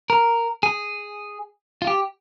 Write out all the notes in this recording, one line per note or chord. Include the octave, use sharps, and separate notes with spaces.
A#4
G#4
F4
G4